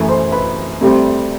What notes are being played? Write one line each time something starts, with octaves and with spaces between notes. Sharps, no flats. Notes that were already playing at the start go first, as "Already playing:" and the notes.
Already playing: F#2 E3 A3 E4
C5 C6
B4 B5
D2 C3 G3 C4